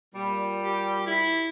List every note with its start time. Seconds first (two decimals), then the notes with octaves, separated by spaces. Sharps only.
0.15 A#2 G3
0.62 G4
1.07 E4